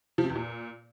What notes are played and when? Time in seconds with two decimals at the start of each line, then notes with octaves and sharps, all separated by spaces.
0.18 F3
0.24 C3
0.30 E2
0.36 A#2